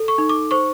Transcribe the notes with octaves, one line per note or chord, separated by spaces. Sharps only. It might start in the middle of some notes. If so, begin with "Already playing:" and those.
Already playing: A4
C#6
D#4
D6
C5 C#6